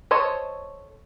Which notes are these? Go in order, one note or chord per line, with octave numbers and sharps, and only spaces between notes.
A4 C5 C#5 D#5